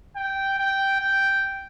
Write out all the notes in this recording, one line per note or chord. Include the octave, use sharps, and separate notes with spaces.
G5
G5
G5